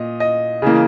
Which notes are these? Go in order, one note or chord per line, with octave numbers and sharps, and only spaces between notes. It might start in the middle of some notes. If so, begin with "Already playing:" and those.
Already playing: A#2 D#5
D#5
C#3 E3 A#3